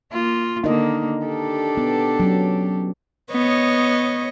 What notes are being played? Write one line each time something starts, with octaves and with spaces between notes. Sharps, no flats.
A#3 F4
D3 A#3 D#4 A#4 D#5
D4 G4 A4
B3
F#3 C#4
B3 C#5 D#5